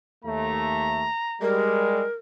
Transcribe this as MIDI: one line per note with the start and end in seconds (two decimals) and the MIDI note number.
0.25 1.06 39
0.25 1.06 57
0.25 1.58 82
1.42 2.04 55
1.42 2.04 56
1.42 2.14 70